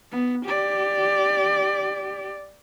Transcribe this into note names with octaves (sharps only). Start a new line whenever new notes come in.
B3
G4 D5